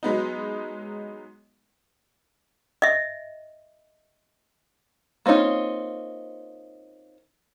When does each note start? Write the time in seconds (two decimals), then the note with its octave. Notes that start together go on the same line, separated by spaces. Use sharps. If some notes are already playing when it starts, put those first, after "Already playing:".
0.03 F#3 G#3 B3 D#4
2.82 D#5 E5
5.26 A#3 C4 C#4 D#4 F4